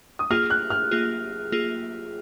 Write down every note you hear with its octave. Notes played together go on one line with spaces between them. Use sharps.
D#6
A#3 F4 G#4 F6
F#6
F6
A#3 F4 G#4
A#3 F4 G#4